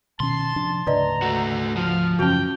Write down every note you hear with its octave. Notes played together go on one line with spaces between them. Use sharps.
B2 D#3 C#4 A5 C6
C3 F3 D4
D2 G#2 C#3 B4 D5 D#5 A#5
A3 F#4
F3 F6
F#2 C#3 F#3 C#4 F#4 G5